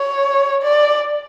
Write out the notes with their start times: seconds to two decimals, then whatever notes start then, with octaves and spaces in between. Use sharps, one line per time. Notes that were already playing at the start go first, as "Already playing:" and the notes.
Already playing: C#5
0.63 D5